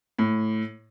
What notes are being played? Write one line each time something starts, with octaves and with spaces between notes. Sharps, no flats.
A2